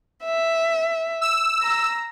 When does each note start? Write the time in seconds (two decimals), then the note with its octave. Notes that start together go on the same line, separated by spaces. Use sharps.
0.25 E5
1.21 E6
1.62 A#5